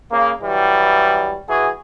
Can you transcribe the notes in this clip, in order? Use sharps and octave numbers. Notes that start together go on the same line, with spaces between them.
C#3 A#3
E3 F#3 G3
E3 F#4 G#4